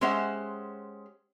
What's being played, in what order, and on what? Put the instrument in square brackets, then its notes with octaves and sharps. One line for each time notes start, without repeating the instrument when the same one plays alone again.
[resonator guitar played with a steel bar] G#3 C#4 G4 C5 E5 F#5